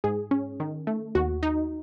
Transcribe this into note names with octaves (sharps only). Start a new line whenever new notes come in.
G#2 G#4
C#4
D#3
A3
D#2 F#4
D#4